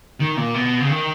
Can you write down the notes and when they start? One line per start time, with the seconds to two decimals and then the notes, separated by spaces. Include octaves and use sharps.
0.20 D#3
0.37 A#2
0.54 B2
0.80 C#3
0.89 D#3